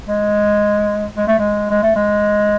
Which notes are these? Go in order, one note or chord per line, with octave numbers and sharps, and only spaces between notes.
G#3
G#3
A3
G#3
G#3
A3
G#3